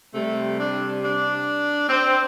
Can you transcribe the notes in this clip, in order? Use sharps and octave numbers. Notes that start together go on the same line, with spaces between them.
C3 G3 A3
D4
D4
C4